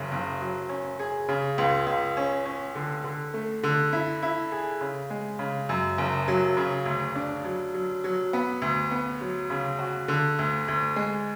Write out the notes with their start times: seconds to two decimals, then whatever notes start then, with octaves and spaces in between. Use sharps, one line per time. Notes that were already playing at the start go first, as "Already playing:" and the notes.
Already playing: F#1 C#3
0.12 F#1
0.41 F#3
0.69 C#4
0.99 G#4
1.29 C#3
1.58 C#2
1.87 C#2
2.17 C#4
2.46 C#4
2.75 D3
3.04 D3
3.34 A3
3.63 D3
3.93 E4
4.23 E4
4.52 G#4
4.81 C#3
5.10 G#3
5.39 C#3
5.69 F#2
5.98 F#1
6.28 F#3
6.57 C#3
6.86 D2
7.16 D4
7.44 F#3
7.74 F#3
8.04 F#3
8.33 B3
8.62 D2
8.91 B3
9.21 F#3
9.50 C#3
9.79 F#4
10.08 D3
10.39 D2
10.68 D2
10.96 G#3